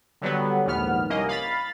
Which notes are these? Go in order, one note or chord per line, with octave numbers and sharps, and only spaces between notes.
D3 F#3 G3 B3
A#1 D#2 G#2 B3 F6
C2 A#3 C#4 D#5
F5 B5 A6